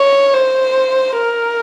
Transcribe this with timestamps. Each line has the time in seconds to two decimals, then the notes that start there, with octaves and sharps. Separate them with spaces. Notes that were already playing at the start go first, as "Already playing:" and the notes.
Already playing: C#5
0.34 C5
1.20 A#4